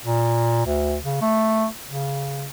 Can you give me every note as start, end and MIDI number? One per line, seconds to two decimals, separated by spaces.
0.04 0.64 46
0.66 0.96 38
1.04 1.20 49
1.22 1.67 57
1.87 2.46 49